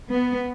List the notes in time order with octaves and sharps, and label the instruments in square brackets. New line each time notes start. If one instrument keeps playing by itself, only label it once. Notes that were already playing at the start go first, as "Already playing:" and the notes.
[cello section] B3